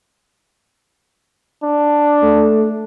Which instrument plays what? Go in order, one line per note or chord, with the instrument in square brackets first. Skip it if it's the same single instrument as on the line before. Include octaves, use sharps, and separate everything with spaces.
[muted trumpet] D4
[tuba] A3